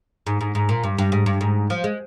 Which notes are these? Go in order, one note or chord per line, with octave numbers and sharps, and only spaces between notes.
G#2
G#2
G#2
A#2
G2
G2
G#2
G2
G#2
F3
G#3